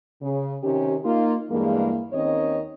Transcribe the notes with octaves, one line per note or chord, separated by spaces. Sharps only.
C#3
C3 D#3 C#4 G4
A#3 D#4 F4
E2 G2 E3 G#3 A#3
D#2 D#3 C4 C#4 C#5 D#5